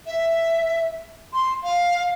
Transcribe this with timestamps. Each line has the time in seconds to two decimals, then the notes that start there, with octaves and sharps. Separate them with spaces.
0.06 E5
1.33 C6
1.63 F5